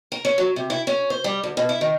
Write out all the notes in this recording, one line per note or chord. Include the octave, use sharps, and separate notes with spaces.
A#4
C#4
F#3
C3
E4
C#4
C5
G3
D2
B2
E4
D#3